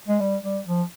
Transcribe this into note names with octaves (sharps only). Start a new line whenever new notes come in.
G#3
G3
G3
F3